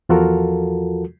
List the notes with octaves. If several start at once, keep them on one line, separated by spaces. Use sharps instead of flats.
E2 F3 F4 F#4 A4 A#4